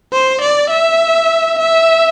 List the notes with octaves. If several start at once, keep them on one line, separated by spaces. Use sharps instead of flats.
C5
D5
E5
E5